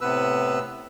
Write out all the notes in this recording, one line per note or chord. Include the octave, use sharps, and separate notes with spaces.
A2 C3 B3 B4 E6